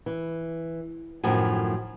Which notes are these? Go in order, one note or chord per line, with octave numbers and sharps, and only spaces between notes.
E3
F#2 A2 D#3 F3 G#5